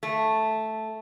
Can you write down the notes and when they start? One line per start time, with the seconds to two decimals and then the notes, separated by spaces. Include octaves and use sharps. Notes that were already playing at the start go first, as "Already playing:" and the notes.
0.03 A3